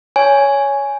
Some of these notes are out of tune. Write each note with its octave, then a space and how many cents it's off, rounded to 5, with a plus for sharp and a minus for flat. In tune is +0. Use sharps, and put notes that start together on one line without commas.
C#5 +10 G#5 +0